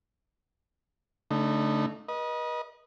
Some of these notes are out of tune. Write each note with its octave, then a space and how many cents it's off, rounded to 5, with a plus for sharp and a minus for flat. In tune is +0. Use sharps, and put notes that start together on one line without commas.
D3 -45 A3 +0 D#4 -25
B4 -40 D#5 +0